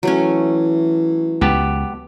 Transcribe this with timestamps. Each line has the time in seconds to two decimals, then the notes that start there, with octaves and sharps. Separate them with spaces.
0.03 E3 F#3 A3 C#4
1.41 C#2 B3 G4 A5